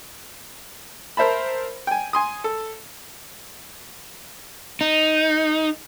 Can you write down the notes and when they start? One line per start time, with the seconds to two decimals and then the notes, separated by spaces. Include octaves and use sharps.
1.17 A#4 C5 E5 A5 B5
1.87 G5 G#5
2.13 G#5 C6 D#6
2.44 A4
4.81 D#4